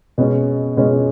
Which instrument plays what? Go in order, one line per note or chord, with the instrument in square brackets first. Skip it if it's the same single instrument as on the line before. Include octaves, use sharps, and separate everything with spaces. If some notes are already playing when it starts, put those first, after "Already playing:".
[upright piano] B2 G#3 C#4
B2 G#3 C#4